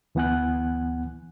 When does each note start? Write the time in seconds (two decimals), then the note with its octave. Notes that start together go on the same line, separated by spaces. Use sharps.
0.15 D2 E3 B3 F#5 G#5 F#6